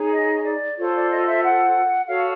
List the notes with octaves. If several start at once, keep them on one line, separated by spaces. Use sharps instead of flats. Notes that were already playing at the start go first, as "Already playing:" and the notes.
Already playing: D#4 G#4 C#5
D#5
D5
F4 A4 C5 C#5
D5
D#5
E5
F#5
F#4 A4 C#5 F5